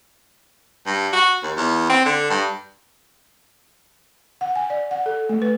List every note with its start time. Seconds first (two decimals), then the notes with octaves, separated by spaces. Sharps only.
0.86 G2
1.12 F#4
1.43 D#2
1.57 E2
1.89 C4
2.05 D3
2.30 G2
4.41 F#5
4.56 G#5
4.70 D5
4.91 F#5
5.06 A4
5.29 A3
5.42 B4